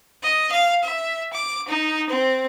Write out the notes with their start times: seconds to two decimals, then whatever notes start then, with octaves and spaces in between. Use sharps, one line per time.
0.23 D#5
0.52 F5
0.83 E5
1.31 D6
1.67 D#4
2.09 C4